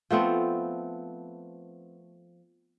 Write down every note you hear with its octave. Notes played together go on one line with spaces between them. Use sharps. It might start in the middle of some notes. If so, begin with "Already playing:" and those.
F3 A3 B3 C4